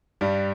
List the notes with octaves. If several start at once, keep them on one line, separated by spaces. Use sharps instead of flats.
G2 G3